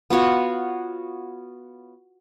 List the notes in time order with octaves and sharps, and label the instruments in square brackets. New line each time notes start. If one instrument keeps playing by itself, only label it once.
[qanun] B3 F4 F#4 C#5